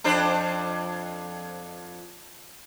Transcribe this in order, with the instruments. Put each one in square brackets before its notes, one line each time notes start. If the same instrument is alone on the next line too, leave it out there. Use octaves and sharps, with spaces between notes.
[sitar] F2 D4 C5